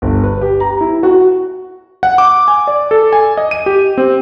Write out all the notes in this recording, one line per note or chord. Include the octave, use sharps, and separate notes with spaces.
G1
B4
G4
A#5
E4
F#4
F#5
D6
G#5
D5
A4
G#5
D#5
D#7
G4
C4